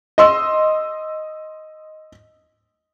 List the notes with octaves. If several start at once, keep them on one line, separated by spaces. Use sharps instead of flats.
D#5 C6 E6